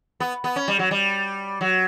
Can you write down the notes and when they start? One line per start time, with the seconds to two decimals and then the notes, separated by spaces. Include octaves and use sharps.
0.20 B3
0.44 B3
0.56 C#4
0.68 G3
0.79 F#3
0.91 G3
1.61 F#3